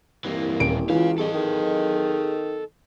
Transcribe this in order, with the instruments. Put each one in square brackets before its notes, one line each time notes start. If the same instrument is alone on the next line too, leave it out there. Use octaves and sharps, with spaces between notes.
[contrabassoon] C2 [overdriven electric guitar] E3 A#3
[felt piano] D#1 D7
[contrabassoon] C#2 [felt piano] E3 [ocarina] F4 [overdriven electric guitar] C#5 F5
[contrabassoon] C2 [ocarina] G#4 [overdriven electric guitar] A4 D#5
[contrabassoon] D#3 [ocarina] G#4